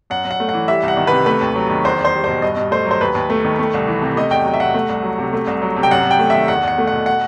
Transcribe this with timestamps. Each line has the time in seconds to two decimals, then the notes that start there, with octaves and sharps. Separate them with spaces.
0.10 F#2 F#5
0.25 F#2
0.31 F#5
0.40 A3
0.49 E3 F#5
0.68 G3 E5
0.83 C2 F#5
0.97 D#3
1.07 C3 B4
1.26 A3 B4
1.41 D#2
1.56 F#3
1.70 D#3
1.85 E2 C5
1.99 E2
2.05 C5
2.14 G3
2.24 B2 C5
2.42 G2 D#5
2.57 G2
2.71 A3 C5
2.86 F#3 C5
3.01 D#2 B4
3.15 D#2
3.30 A3
3.45 D#3
3.59 A3
3.74 C2
3.87 E3
4.02 C3
4.16 A3 D#5
4.31 E2 G5
4.45 F#3
4.54 E5
4.60 C3 F#5
4.75 A3
4.89 C2
5.03 F#3
5.19 C3
5.33 A3
5.47 C2
5.62 F#3
5.76 C3
5.83 G5
5.91 F#2 F#5
6.05 F#2
6.11 G5
6.19 A3
6.30 D#3 E5
6.48 E2 F#5
6.63 E2 F#5
6.78 A3
6.87 B2 F#5
7.06 F#5